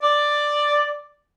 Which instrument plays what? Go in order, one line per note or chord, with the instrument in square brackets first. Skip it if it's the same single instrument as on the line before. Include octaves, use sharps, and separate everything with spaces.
[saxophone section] D5